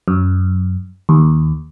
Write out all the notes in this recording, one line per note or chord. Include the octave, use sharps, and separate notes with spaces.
F#2
D#2